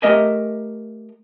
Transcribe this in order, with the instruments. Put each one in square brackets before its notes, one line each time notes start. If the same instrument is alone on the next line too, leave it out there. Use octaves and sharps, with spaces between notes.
[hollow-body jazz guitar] A3 G4 A#4 D#5 E5 G#5